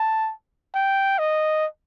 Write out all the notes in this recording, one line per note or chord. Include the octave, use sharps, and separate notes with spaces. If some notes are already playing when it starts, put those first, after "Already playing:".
Already playing: A5
G5
D#5